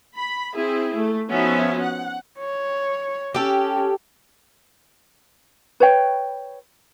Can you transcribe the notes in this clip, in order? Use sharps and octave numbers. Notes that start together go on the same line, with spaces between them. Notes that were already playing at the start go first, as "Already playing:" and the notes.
B5
C4 E4 G#4
A3
F3 B3 C#4 D#4 F#4 E5
F#5
C#5
C#4 G4 A4
B4 C#5 G5